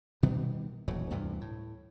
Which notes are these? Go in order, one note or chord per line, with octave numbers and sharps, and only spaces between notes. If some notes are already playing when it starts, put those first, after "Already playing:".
B2 D#3 G3 B3
D#1 E2 A2 F#3
D2 G2 C3 E3
A2